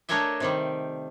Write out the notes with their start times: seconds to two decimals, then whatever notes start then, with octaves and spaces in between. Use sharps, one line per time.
0.09 A3 D4 A#4 C#5 D#5 E5
0.40 C3 D#3 G3